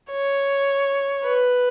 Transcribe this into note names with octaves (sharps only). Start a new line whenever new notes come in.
C#5
B4